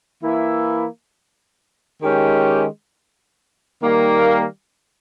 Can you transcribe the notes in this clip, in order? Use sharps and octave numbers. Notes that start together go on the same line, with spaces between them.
E3 A#3 E4
D#3 G#3 C#4 G4
D#3 G3 A#3